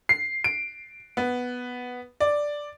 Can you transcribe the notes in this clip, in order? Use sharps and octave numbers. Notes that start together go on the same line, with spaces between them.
C7
D7
B3
D5